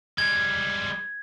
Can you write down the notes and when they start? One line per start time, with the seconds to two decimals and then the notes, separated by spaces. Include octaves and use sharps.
0.18 G3 G#3 G#6